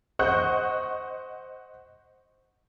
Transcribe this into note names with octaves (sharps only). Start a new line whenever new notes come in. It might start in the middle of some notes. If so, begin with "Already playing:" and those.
C5 D#5 F#5 C#6 F#6 G6